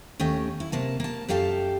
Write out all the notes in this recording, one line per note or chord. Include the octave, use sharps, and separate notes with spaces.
D#2 A3 C#4 D#5 G5
E4
C3 A#3 A5
A#3 A5
F#2 G4 A4 F5 G5 A5